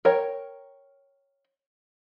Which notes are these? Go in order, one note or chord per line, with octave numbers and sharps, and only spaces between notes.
A#4 C#5 G5